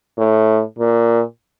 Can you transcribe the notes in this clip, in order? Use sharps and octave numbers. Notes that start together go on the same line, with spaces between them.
A2
A#2